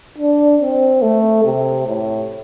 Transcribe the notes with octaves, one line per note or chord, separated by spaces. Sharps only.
D4
C4
A3
C3
A2